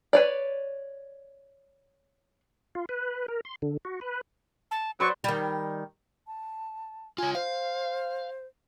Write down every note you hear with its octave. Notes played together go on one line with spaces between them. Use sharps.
B4 C#5 D5
F4
B4
A#4
C6
D3
F#4
B4
A5
F#3 B4 C5 D5 C#6
D#3 G3
A5
F4 C#5 G#5
C5 F5